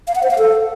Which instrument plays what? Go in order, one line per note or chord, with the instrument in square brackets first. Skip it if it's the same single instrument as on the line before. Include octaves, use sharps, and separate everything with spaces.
[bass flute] F5
F#5
C5
F5
A4